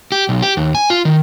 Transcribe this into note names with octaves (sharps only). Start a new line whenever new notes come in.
G4
B1
G4
D#2
G#5
F4
D#3